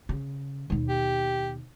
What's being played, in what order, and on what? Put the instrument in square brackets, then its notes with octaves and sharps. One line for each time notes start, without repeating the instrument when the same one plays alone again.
[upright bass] C#3
D#2 B2
[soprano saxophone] G4